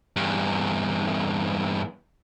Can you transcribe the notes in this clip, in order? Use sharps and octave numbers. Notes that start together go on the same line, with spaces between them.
E2 G2